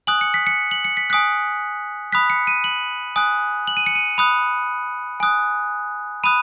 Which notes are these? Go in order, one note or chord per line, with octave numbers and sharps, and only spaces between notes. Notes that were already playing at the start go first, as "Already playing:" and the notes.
G#5 D#6 F#6 F#7
C#7
B6
C#7
F#7
C#7
B6
G#5 D#6 F#6 B6
B5 D#6 F#6 B6
C#7
D#7
F#7
G#5 D#6 F#6
F#7
D#7
C#7
D#7
B5 D#6 F#6
G#5 D#6 F#6
B5 D#6 F#6 D#7